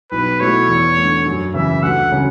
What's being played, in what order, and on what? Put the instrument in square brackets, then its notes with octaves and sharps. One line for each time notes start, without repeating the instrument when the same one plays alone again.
[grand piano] B1 [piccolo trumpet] B4
[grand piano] B2 A3 E4 [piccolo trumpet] C#5
[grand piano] E2
D3 A3
F#2
[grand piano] C#3 E3 [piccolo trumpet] E5
[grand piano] D2 [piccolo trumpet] F#5
[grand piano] C#3 F#3